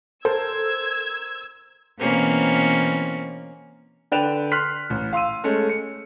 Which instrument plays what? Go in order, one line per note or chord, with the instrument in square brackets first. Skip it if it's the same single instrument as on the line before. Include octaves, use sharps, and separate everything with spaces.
[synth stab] A4 [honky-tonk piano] A#4 C5 [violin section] E6 G#6
[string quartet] B2 E3 A#3 C4 C#4
[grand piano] D3 B4 D5 G5 E7 F7
C6 F6 F#6 B6 C7
A1
F5 C6 E6 D#7
G#3 A3 C#4
C#7